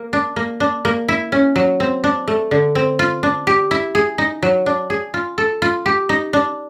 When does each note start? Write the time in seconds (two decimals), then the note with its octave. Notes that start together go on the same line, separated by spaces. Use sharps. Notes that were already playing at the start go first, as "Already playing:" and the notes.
Already playing: A#3
0.13 D4
0.36 A#3
0.60 D4
0.85 A#3
1.08 E4
1.32 C#4
1.56 F#3
1.80 C4
2.04 D4
2.28 A3
2.51 D3
2.75 C4
2.99 F4
3.23 D4
3.47 G4
3.71 E4
3.95 G#4
4.18 D#4
4.43 F#3
4.66 D4
4.90 G#4
5.14 F4
5.38 A4
5.62 F4
5.86 G4
6.09 D#4
6.33 D4